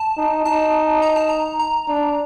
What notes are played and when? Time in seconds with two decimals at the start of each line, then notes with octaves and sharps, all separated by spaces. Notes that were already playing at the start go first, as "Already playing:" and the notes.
Already playing: A5
0.17 D#4
0.45 D#4 A5
1.02 A#5
1.16 A5
1.29 A#5
1.59 A#5
1.88 D4